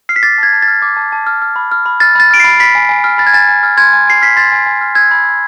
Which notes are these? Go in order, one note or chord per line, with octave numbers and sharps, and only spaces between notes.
F6 C7
B6
D6 A6
A5 G#6
A5
A6
F6
D6
A5
A5
F6
F6
B5
F6
B5
F6 A6
B5 A6
F6 D7
B5 C7
B5 B6
G#5
G#5
F6
B5 A6
G#6
G#5 A6
G#5
F6
C6 G#6
G#5
G#5 C7
F6 B6
C6 A6
G#5
G#5
F6
E6 G#6
B5
E6